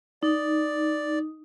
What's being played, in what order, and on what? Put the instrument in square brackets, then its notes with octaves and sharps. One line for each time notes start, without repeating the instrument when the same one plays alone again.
[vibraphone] D#4 [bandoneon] D5